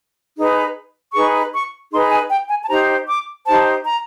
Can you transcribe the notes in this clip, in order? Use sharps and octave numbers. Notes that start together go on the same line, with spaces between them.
D#4 G#4 B4
D#4 G#4 B4 C#6
C#6
D#4 G#4 B4 C6
G#5
G5
G#5
A5
D#4 G4 C5 A#5
D6
D#4 G4 C5 A5
A#5